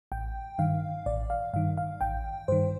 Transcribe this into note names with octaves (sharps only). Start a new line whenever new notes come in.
A1 G5
G2 D#3 F5
A1 D5
F5
G2 D#3 F5
F5
A1 G5
G2 D#3 C5